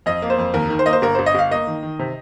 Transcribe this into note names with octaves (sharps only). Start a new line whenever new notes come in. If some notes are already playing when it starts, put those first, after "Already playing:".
F2 D#5
A#3
C5
F2
D#2 A#4
D#3
C5
A#3 D#5
C5
G1 A#4
G1 C5
D#5
G1 F5
A#3 D#5
D#3
D#3
C3